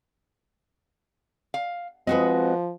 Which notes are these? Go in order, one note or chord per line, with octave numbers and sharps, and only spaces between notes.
F5
F3 G#3 C4 F#4 B4 D#5